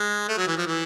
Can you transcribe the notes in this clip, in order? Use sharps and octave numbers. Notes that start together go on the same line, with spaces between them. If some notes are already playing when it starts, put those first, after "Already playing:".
Already playing: G#3
A3
F#3
E3
F3
E3